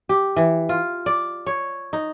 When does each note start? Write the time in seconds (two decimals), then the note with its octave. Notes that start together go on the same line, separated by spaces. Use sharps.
0.09 G4
0.36 E3
0.69 F4
1.06 D5
1.46 C#5
1.93 D#4